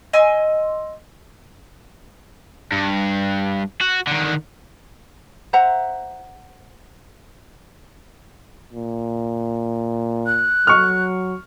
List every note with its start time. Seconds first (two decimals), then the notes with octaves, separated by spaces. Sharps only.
0.13 D#5 G#5 C6 E6
2.72 G2
3.81 F#4
4.07 D3 D#3
5.53 C5 E5 F#5 A#5
8.73 A#2
10.27 F#6
10.67 F#3 C#6 F6